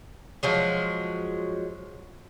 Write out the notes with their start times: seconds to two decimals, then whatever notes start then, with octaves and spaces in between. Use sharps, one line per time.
0.43 F3 F#3 G#3